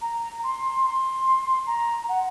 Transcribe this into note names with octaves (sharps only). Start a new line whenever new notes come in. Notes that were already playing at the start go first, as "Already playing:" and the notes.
A#5
C6
C6
A#5
F#5